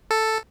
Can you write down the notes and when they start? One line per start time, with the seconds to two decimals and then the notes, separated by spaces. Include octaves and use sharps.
0.11 A4